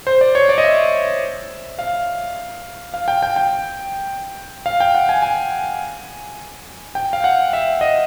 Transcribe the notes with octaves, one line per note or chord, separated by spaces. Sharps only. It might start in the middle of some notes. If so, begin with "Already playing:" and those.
C5
D5
C#5
D5
D#5
E5
F5
F5
G5
G5
G5
F5
G5
F#5
G#5
G#5
G5
F5
F#5
E5
D#5